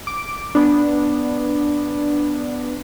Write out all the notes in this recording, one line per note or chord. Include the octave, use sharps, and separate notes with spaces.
D6
B3 D4